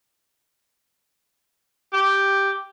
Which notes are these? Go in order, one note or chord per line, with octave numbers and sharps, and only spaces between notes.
G4